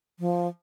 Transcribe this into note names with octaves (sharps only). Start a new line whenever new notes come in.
F3